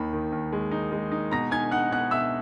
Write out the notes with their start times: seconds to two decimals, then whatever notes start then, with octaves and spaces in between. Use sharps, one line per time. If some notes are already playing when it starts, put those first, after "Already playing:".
Already playing: D#2 D#3 B5
0.13 D#3
0.32 D#2
0.53 G#3
0.71 D#4
0.92 G#3
1.12 D#4
1.31 B2 A#5 A#6
1.51 D#4 G#5 G#6
1.71 D#4 F#5 F#6
1.91 B2 F#5 F#6
2.11 B2 E5 E6